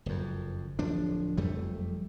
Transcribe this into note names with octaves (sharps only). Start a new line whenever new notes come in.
F#1 F2
D1 F3 D4
F#1 F2 G3 A3